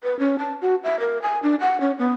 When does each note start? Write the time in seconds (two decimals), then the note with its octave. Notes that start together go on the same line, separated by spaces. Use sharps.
0.04 B4
0.19 C#4
0.39 A5
0.62 F#4
0.84 E5
1.00 A#4
1.22 G#5
1.43 D4
1.60 F#5
1.81 C#4
1.99 B3